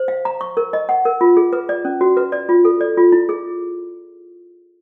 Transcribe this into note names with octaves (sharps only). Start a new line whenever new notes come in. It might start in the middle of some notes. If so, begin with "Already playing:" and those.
Already playing: C5
F5
A#5
C#6
A#4
D#5
F#5
A#4
F4
G#4
B4
D5
C#4
F#4
B4
D5
F4
A4
D5
F4
E4
G#4